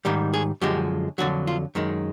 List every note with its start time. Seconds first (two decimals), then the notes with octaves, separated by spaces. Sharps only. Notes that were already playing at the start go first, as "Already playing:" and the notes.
0.05 G#2 D#3 G3 G4
0.34 G#4
0.61 F#2 D3 F3 G#3 G4
1.18 F2 D3 F#3 F#4
1.47 F4
1.75 F#2 D#3 G#3